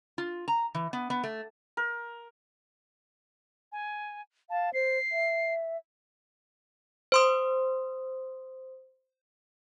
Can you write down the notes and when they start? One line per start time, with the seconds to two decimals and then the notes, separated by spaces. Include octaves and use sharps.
0.18 F4
0.48 A#5
0.75 E3
0.93 B3
1.10 B3
1.24 A3
1.77 A#4
3.72 G#5
4.50 F5 A5
4.74 C5 C7
5.12 E5
7.12 C5 C6 D#6